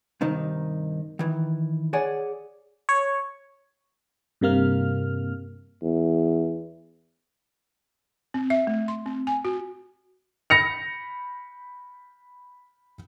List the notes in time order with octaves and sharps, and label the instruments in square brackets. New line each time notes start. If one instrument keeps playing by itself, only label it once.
[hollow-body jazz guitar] G2 C3 D#3 D#4
D#3 E3
G#4 C#5 D5 F#5 G#5
[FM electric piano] C#5
G2 C3 A#3 F6
[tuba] E2
[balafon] C4
E5
A3
C6
C4
G#5
F#4
[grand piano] B5 A#6 C#7 F7